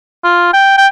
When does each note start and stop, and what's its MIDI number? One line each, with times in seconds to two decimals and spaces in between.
0.24 0.50 65
0.53 0.73 79
0.78 0.87 79